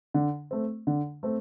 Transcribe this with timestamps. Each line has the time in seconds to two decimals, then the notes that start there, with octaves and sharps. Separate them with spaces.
0.14 D3
0.51 A3 C4
0.87 D3
1.23 A3 C4